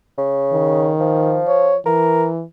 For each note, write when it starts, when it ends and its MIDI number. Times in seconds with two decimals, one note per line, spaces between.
0.18 0.93 49
0.53 1.41 51
1.00 1.75 53
1.47 1.77 73
1.86 2.43 52
1.86 2.27 70